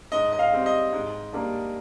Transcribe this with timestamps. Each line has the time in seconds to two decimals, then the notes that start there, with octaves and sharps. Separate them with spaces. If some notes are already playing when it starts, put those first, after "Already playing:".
0.12 G#2 D#5
0.33 D#5
0.39 F5
0.53 G3 C4
0.66 D#5
0.93 G#2
1.33 G3 A#3 D4